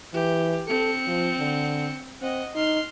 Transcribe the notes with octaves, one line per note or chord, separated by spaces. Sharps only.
E3 G4
C4 A4 C#7
F3
D3
C4 D#5 F#5
D#4 C6 F6